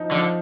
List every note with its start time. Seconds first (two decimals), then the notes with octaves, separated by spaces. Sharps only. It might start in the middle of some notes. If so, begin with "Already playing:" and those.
Already playing: F3 D#4
0.11 D3 F3